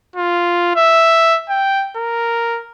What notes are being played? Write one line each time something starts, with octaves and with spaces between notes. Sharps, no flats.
F4
E5
G5
A#4